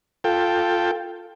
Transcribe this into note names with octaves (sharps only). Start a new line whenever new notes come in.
F4 A4 G5